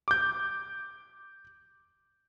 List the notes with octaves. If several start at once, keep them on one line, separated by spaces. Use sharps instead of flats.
D6 G6